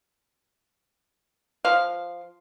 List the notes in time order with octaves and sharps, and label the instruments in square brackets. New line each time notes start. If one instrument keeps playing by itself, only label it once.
[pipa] F3 F5